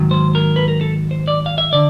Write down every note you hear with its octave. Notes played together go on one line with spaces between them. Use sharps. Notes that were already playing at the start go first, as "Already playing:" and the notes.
Already playing: G#2 D#3 F#3
C5
A#4
B4
A#4
A4
C5
D5
F5
E5
D3 D5